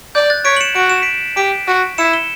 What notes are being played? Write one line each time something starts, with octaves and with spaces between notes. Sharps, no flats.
D5 G6
F#6 A6
C#5 B6 D7
F#7
C#7 E7
F#4 D7
E7
B6 D7
G4 B6 D7
F#4
E4 C#7 E7
E7 G7